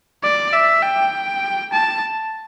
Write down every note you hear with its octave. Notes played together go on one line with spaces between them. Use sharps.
D5
E5
G5
A5